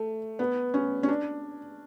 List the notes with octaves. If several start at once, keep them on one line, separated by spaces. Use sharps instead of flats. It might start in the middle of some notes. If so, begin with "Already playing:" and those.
Already playing: A3
B3
C#4
C#4
D4